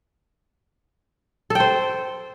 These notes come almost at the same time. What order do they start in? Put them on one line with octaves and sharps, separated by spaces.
A4 G5 C5